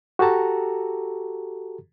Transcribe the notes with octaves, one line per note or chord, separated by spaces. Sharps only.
F#4 G4 A4 A5 A#5